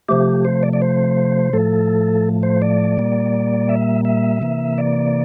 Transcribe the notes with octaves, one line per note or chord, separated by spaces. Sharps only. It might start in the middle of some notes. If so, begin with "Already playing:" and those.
C3 F3 A3 G4
C5
D5
D5
C5
A2 F3 A3 A4
C5
D5
A#2 G3 A#3
E5
E5
C3 E3 A#3
D5